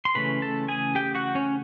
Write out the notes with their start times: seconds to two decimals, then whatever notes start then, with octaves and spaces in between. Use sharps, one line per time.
0.05 C6
0.15 C#3 E3 A3 C#4 B4 B5
0.42 A4 A5
0.68 G#4 G#5
0.95 G4 G5
1.15 F#4 F#5
1.35 C#4 C#5